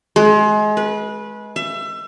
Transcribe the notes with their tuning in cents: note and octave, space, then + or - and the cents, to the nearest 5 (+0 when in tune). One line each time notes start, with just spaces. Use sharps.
G#3 +30
B4 -20
E5 +30